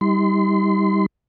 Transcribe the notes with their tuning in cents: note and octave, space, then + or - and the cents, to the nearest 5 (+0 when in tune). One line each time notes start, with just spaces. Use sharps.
G3 +0 D#4 +40 C6 -30